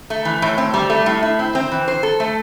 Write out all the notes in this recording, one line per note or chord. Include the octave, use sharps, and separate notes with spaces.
A3
E3
A2
C4
G3
A3
A2
E4
C4
C4
E3
C5
A4
A3